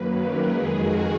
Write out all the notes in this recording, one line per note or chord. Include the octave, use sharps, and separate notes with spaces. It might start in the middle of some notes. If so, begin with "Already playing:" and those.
Already playing: F#2 D#3 F#3 A#3 B4
A#4
F2 D#3 G#3 G#4
F#4